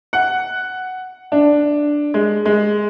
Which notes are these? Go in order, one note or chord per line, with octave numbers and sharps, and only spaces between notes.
F#5
D4
G#3
G#3